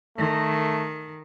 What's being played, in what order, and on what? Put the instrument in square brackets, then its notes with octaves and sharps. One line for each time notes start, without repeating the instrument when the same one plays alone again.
[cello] D#3 [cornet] A3